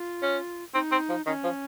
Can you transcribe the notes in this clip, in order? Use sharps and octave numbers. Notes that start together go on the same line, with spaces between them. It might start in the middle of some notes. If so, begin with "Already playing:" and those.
Already playing: F4
C#4
C4 D#4
C4
F3
D#3 C#4
F3